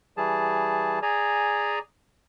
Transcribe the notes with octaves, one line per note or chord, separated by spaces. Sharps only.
E3 G3 G#4 A5
G#4 D5 G#5 A#5